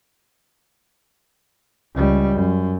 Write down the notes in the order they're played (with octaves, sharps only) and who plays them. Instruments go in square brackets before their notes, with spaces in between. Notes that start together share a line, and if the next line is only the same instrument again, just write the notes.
[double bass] C#2 G3
F#2